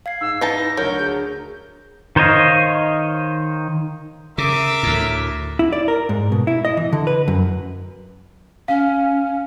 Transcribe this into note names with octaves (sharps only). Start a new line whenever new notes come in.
F5 G#6 C7
G#2 E6
E3 D#4 A5 A#5 A#6
D2 F#3 A#4 G6
G#4
D#3 C5 C#5 D#5 F5
C#3 A#4 E5 D6
D2 A2
E4
D5
A#4
G#2
B2
E4
D#5
E3
D3
B4
F#2
C#4 F5